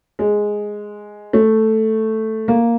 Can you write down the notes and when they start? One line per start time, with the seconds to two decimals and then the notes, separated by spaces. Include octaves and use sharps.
0.19 G#3
1.33 A3
2.48 A#3